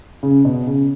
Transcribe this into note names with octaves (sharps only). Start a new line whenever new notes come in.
C#3
B2
C#3